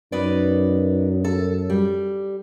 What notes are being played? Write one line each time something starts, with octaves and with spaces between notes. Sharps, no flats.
F#2 D#4 B4 D5
A4
G3